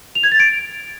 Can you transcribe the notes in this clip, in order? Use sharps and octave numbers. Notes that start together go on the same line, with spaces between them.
F7
G#6
A6
D7